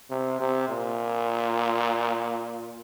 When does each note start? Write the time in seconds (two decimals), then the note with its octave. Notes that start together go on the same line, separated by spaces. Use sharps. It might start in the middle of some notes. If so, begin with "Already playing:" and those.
0.10 C3
0.40 C3
0.69 A#2